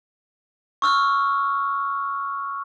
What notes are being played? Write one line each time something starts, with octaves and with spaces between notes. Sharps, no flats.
C#6 E6 F6